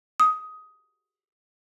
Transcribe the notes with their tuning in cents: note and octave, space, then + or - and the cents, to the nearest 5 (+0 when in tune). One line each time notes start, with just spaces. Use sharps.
D#6 +15